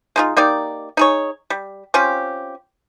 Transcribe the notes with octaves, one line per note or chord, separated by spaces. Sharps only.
G#3 D#4 F4
A#3 D#4 G4 D5
D#4 G#4 C#5
G3
C4 C#4 F4 G4